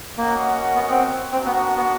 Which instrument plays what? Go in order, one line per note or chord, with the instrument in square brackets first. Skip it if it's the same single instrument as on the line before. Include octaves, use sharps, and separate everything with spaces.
[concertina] A#3 [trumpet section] C#4 F#4 A#4 D#5 F#5
[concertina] B3
C4
[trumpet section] A#3 D4 F#4 [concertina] C4
[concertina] B3
B3